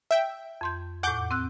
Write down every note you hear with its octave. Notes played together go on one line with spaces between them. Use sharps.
E5 G5
F2 C6 G6
E2 A2 F#5 D6 G6
C4 E6 F#6